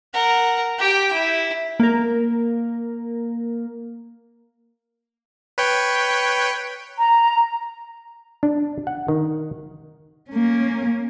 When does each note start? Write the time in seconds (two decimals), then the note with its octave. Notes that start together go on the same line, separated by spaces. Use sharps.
0.13 A#4 F#5
0.78 G4 G5
1.13 E4
1.80 A#3 A#4
5.58 B4 C#5 G5
6.99 A#5
8.43 D4
8.87 F#5
9.08 D#3
10.31 A#3 C#4